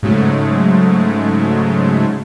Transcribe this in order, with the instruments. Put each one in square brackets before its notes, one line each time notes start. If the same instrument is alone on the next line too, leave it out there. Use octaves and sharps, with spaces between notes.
[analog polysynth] G#2 C#3 F#3 G#3 A3